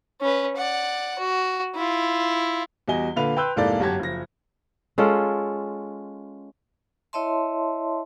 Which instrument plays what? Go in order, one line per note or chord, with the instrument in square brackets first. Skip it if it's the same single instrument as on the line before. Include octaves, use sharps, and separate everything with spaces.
[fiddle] C#4 B4
D5 F#5
F#4
E4 F4
[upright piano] E2 G3 F#4 D#5 G#5 G7
A#2 D3 B4 F5 F7
B4 G5 C6 E6 F#6 G6
F1 G#2 A#3 E4 A4 D5
G1 F#2 F#4 G4 A5 G#6
F#1 F3 A#6
[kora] G#3 C#4 F4 A4
[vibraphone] E4 C#5 D#5 E5 A5 C6